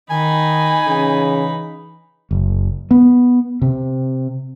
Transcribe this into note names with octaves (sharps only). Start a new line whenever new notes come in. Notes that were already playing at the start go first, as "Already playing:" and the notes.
D#3 D#4 G#5 B5
C#3 E3
F#1
B3
C3